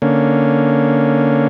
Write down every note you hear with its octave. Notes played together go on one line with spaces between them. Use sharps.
D3 A#3 C#4